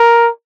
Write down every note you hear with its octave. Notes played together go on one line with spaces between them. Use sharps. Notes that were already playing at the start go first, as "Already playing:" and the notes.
Already playing: A#4